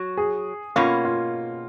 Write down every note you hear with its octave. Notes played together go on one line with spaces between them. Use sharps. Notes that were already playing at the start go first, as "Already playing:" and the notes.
Already playing: F#3 F#4
G#4
B2 A#3 C#4 F4
F4